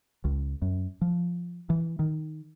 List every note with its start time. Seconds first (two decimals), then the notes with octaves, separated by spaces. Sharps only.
0.24 C#2
0.62 F#2
1.01 F3
1.70 E3
1.99 D#3